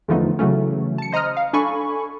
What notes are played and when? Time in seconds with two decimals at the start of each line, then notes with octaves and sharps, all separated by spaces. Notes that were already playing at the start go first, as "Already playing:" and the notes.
0.08 E2 D3 F3 A3 B3 D#4
0.39 C#3 E3 F#3 A3 C#4
0.98 A5 C#7
1.12 C5 D#5 A#5 D#6 F6
1.37 F5
1.53 D4 A4 G#5 B5 C#6